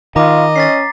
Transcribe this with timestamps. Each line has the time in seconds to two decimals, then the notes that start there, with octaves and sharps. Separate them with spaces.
0.16 D#3 F4 D#5 A#5 D6
0.56 C#4 A6 B6 C7